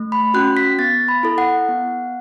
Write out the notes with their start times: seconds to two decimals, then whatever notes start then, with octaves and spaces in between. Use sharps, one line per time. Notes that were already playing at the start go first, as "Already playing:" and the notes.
Already playing: A3
0.12 B5
0.34 C#4 F#4 F#6
0.57 B6
0.79 B3 A6
1.08 B5
1.23 E4 A4
1.38 F#5
1.68 B3